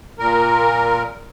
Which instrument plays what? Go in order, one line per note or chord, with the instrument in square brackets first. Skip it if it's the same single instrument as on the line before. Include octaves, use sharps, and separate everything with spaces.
[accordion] A#2 A#4